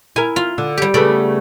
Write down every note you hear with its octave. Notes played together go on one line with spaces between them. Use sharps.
E4 A#4 G#5
F4
D3
G3 G4
C#3 A3 B3 D5